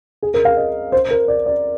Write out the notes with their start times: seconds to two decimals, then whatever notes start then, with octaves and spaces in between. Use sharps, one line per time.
0.22 G#4
0.34 A#4
0.45 F5
0.57 D#5
0.92 C5
1.11 A#4
1.28 D5
1.46 D5